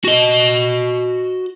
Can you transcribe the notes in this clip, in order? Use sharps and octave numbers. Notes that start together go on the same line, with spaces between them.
F#4 D#5